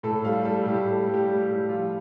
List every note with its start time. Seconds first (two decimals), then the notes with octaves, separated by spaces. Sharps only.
0.03 A2 A4
0.24 G3 F5
0.45 G3 A4
0.66 A2 G4
0.86 A2 A4
1.08 G3
1.14 G4
1.28 G3
1.42 G4
1.49 A2
1.69 F3 F4